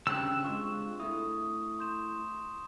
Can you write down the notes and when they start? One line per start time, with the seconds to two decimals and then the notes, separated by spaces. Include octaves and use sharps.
0.07 C#3 G3 C4 D4 E6 F#6
0.44 G#3 F4 C#6
1.00 A3 E4 D#6
1.79 C6 G6 E7